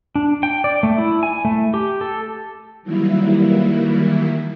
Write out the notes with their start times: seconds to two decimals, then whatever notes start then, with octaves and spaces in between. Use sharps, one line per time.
0.15 D4
0.43 G5
0.64 D5
0.83 A3
0.98 E4
1.23 G#5
1.45 A3
1.74 G4
2.01 A4
2.83 D#3 E3 F#3 G3 A#3 E4